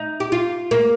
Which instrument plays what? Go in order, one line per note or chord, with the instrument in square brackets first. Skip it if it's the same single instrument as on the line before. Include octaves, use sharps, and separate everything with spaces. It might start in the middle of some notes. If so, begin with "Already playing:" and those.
Already playing: [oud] D#4
G4
F4
A#3